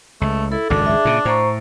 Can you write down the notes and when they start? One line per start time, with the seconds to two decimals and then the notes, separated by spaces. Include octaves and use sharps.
0.21 C#2 A3
0.52 E4 A4
0.70 G#1 C#2 F#2 D4
0.86 G#4 E5
1.05 A#2 C#3
1.25 A2 C5 A#5 C#6